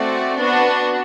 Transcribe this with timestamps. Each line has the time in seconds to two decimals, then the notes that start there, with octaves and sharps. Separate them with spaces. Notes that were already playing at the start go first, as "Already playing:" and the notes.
Already playing: A3 C4 F#4 D5
0.37 B3 D4 F#4